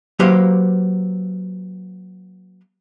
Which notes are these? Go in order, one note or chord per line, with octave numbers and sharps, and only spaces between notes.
F#3 A#3 G4 B4 C5 F5